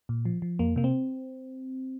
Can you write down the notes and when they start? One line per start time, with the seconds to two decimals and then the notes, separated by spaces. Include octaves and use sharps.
0.09 A#2
0.25 F3
0.42 F3
0.59 F2 A#3
0.76 C3 A#3
0.84 C4